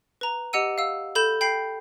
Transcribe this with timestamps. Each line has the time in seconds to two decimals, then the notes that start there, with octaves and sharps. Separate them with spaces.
0.21 B4 A#5
0.53 G4 D#5 F#5 E6 D#7
0.78 F5 E6
1.15 A4 B5 G6 E7
1.41 G5 B5 G6 C7